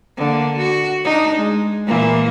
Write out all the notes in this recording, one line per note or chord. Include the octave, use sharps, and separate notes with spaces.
D3 A#3
F#4
D4 D#4
G#3
A#2 E3 A#3